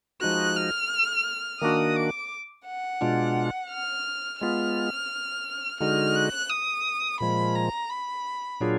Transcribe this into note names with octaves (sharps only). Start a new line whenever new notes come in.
F3 G#3 D#4 F#4 F#6
F6
D#3 A#3 D4 F#4 D#6
D6
F#5
B2 G#3 D4 F4
F6
G#3 B3 F4 F6
D3 G#3 D#4 F#4 F6
F#6
D#6
A#2 F3 G#3 B5
A#5
B5
A#2 F#3 D4 F4 G#4